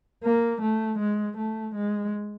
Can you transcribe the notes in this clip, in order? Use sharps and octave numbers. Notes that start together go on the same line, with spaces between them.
A#3
A3
G#3
A3
G#3